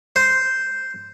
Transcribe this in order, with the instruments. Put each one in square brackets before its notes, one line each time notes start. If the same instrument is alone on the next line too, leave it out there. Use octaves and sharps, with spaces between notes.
[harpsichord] C5